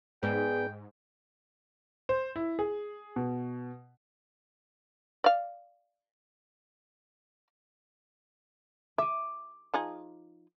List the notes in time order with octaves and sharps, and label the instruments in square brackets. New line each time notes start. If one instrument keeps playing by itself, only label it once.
[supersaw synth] G#2 [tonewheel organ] B3 B4 D5 [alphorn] G#4 [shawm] G5
[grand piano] C5
E4
G#4
B2
[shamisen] D5 F5
[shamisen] E5 [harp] D6 D#7
[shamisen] F3 D#4 G#4